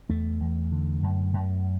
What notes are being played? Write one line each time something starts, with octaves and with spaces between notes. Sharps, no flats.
E2 A3
E2
D3
F#2
F#2